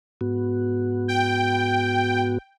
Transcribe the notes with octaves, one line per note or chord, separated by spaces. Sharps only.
G#2 B3 F#4
G5